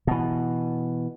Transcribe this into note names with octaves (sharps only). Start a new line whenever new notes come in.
B2 E3